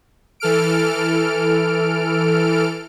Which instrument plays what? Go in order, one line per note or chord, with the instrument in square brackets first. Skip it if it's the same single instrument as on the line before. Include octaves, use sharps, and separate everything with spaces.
[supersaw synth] E3 A4 F6 D7